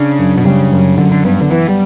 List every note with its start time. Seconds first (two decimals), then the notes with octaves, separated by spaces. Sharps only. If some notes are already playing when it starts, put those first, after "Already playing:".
Already playing: C#3 D4
0.19 F#2
0.38 B2
0.45 C#3 G3
0.72 F#2
0.98 F#2 D3
1.12 D3
1.24 G2 B3
1.42 D3
1.51 E3 B3
1.69 G3